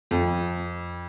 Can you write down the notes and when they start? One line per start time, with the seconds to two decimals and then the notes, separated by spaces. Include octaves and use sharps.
0.11 F2